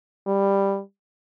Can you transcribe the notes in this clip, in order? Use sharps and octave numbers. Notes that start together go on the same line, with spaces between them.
G3